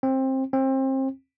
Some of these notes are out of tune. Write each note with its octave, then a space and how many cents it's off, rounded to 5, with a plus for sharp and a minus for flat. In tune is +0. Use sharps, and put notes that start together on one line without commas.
C4 +20
C4 +30